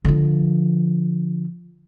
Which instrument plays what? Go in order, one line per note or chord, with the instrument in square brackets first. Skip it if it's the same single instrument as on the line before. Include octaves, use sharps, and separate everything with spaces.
[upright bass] D3 F3